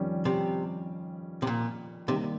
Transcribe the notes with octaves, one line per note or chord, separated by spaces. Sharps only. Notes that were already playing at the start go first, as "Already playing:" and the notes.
Already playing: F2 D#3 G3 C#4
C3
C3
A#2
C3 D#3 G3 A#3